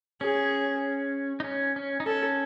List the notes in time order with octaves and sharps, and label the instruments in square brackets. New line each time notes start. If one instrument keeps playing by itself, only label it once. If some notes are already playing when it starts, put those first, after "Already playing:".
[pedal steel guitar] C#4 [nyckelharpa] G#4
[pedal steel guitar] D#4
C#4
C#4
D#4
[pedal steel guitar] C#4 [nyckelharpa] A4